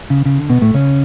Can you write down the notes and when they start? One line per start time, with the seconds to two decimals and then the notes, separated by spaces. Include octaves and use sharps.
0.10 C#3
0.25 C#3
0.38 D3
0.49 B2 B3
0.62 A2 A3
0.74 C#3 C#4